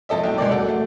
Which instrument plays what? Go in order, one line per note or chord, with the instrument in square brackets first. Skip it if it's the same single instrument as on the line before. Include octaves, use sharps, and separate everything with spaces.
[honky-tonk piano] F2 A4 D#5 E5
B1 E4 G5
C#2 G#3 A#3 D5
F#3 F#4 A4
A3